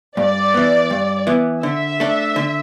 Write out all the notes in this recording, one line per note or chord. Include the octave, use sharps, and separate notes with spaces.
G2 D5
E3 B3
G2
E3 B3
D3 E5
A3 D4
D3